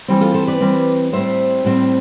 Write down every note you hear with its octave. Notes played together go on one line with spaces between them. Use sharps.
E3 G3 C4
F4 A4
A4 C5
B4 D5
E3 G3 C4
A2 G3 C4 C5 E5
A2 G3 C4